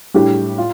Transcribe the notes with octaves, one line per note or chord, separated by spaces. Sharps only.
A2 G3 D4 G4
F4